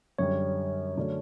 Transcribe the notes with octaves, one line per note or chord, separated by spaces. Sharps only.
F#2 D3 G3 C#5
D3 F#3 A3 D4